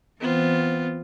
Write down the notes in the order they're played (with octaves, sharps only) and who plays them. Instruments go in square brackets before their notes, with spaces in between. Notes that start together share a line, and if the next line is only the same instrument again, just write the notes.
[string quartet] E3 C4 [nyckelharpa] B3 F4